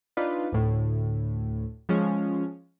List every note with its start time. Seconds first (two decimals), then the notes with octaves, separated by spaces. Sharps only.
0.17 D4 D#4 F4 B4
0.52 D2 A2
1.89 F3 G#3 C#4